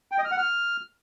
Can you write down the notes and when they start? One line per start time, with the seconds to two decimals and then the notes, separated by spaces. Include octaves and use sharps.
0.11 G5
0.18 D#5
0.25 F6
0.31 F#5
0.38 F6